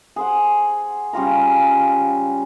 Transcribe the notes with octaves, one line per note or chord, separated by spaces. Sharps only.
G#4 C5 F#5
C#3 G3 F4 A#5